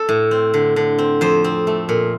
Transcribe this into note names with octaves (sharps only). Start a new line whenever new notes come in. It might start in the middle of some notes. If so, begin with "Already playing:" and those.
Already playing: A4
A2
C4
D3
D3
C4
F2 C5
C4
A3
A#2